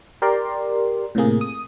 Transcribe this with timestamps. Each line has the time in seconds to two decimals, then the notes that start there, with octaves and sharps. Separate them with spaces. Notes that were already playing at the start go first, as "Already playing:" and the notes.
0.22 G4 A#4 D5 C6
1.15 A2 C3 A#3 G#4
1.41 D#6